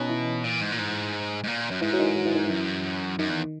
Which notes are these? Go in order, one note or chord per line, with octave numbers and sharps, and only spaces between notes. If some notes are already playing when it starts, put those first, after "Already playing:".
Already playing: B2 C#4 D#4
E3
A#2
G#2
A#2
G#2
G#2
A#2
F#2
G#2 E3
F#3
D#3
E3
F#3
E3
D#3
F#2 E3
F#2 D#3
E2